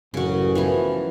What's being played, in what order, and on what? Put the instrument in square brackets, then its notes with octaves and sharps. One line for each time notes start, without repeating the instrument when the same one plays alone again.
[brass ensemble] A1 F#2 [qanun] C#3 F#4
[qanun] E3 F3 B3